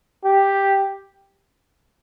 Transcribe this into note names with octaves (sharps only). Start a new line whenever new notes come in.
G4